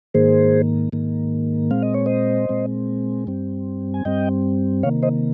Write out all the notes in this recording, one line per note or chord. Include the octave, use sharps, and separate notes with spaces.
G#2 D#3 A#3 G#4 C5
G#2 D#3 A#3
A#2 G#3 C4 F5
D#5
C#5
C5 D#5
A#2 G#3 C4
G2 G3 C4
G#5
G2 G3 C4 D#5 G5
C3 D#3 A#3 C#5 F5
C5 D#5